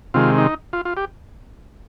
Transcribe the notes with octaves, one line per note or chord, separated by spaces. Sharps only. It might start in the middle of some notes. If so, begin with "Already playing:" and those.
C3 D#3 G#3 F4
D#4
F4
F4
G4